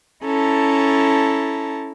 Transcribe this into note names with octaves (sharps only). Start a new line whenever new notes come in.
C#4 E4 A4 A5 A#5